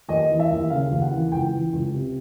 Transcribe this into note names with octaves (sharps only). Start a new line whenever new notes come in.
D#2 D#5
E3
E5
D#2
C#3 F5
D#2
F#5
E3
C#2 G5
E3
C#2
C3